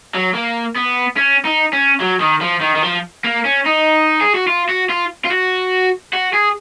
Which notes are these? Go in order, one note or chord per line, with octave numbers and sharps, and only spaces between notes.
F#3
A#3
B3
C#4
D#4
C#4
F#3
D#3
F3
D#3
D#3
F3
A#3
C#4
D#4
G#4
F#4
F4
F#4
F4
F4
F#4
F#4
G#4